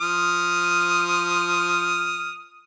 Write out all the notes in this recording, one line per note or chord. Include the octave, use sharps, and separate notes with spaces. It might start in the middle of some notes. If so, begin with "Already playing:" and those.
F3 D#6 F6